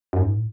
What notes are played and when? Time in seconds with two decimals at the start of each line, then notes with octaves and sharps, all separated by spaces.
0.13 F#2
0.22 G#2
0.31 A2